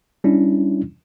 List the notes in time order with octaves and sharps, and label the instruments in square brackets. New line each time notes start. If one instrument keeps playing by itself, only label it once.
[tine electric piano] G3 C#4 D4 E4